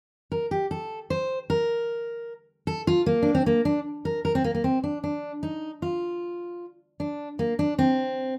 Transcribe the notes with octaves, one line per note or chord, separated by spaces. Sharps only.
A#4
G4
A4
C5
A#4
A4
F4
A#3
D4
C4
A#3
D4
A#4
A#4
C4
A#3
A#3
C4
D4
D4
D#4
F4
D4
A#3
D4
C4